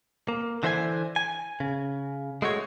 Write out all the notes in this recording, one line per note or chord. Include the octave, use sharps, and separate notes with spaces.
A#3
D3 E3 C5 E5 G5 G#5
G#5
C#3
G#3 A3 F#4 C#5